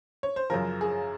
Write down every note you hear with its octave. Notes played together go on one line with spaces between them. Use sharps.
C#5
C5
F#2 C#3 F3 A#4
G#4